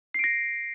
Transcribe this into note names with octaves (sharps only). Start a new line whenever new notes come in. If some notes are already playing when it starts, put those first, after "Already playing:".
A#6 C7 D7